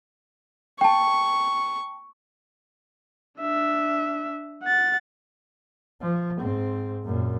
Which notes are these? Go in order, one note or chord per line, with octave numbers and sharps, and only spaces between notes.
G5 A5 C#6
D4 E5
F#5 A6
F3
G#2 C4
F#2 A#2